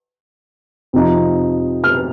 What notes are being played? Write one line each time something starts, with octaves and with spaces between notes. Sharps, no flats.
F2 C3 F3 D#4
F6